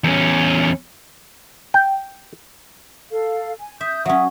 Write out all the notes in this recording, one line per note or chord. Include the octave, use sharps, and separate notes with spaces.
E2 C#4
G5
A4 F5
G#5
E5 D#6 G6
F#3 C#4 E5 D#6